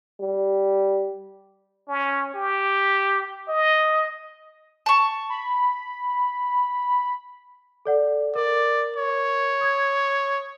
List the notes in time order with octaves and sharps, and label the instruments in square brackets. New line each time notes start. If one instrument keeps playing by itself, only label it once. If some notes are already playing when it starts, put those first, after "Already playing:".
[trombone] G3
[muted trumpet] C#4
G4
D#5
[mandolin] A5 C#6
[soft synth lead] B5
[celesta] A4 D5 F#5
[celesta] A#4 [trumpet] D5
[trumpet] C#5
[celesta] D#6 G#6